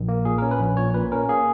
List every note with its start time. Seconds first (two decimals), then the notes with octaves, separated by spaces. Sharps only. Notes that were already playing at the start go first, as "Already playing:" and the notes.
Already playing: A#1
0.08 A#3
0.25 A#2 G#4
0.38 C#4 A#4
0.51 B4
0.60 A#1
0.77 A#2 C#5
0.94 A#2 B4
1.12 C#4 A#4
1.29 A#3 G#4